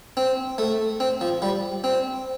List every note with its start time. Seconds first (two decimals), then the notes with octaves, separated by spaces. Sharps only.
0.17 C4
0.58 A3
1.00 C4
1.21 F3
1.42 G3
1.84 C4